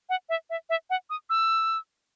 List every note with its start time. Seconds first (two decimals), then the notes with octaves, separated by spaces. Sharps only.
0.09 F#5
0.29 E5
0.50 E5
0.70 E5
0.90 F#5
1.10 D#6
1.30 E6